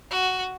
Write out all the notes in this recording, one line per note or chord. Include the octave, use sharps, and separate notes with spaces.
F#4